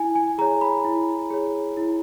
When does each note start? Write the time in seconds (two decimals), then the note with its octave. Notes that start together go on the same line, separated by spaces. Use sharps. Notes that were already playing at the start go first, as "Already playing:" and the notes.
Already playing: E4 G#5
0.15 G#5
0.38 G#4 C#5 A#5
0.61 B5
0.85 E4
1.30 G#4 C#5
1.77 E4